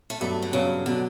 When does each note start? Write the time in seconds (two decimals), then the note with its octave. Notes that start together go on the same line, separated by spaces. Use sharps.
0.10 A3
0.20 G2 F#3 A3 B3
0.42 D3
0.53 G2 C#3 F#3 B3
0.86 B2 D3 F#3 B3